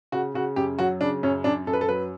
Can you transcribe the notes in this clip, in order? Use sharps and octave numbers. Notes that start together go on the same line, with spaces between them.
C#3 F#4
C#3 F#4
F#2 G4
F#3 F#4
C#3 D4
F#2 C#4
F#2 D4
F#2 A4
B4
A4
F#3 B4